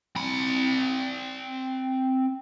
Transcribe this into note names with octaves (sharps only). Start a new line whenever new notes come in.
C4 B5